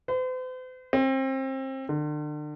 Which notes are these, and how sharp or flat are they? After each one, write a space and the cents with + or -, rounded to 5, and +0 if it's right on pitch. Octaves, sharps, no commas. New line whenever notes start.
C5 -45
C4 +30
D3 +40